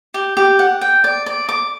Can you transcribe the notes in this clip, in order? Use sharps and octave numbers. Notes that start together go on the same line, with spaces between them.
G4
G4
F#5
G5
D5
D5
D6